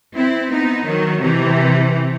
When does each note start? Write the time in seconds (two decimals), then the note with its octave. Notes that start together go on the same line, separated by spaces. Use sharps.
0.16 C4 E4
0.51 B3 D#4
0.86 D#3 F#3
1.21 C3 E3